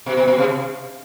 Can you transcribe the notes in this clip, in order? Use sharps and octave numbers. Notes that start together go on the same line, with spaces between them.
B2
B2
B2
C3